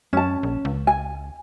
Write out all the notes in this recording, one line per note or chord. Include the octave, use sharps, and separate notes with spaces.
F#2 C#4 A5
A#1
C#2
G#5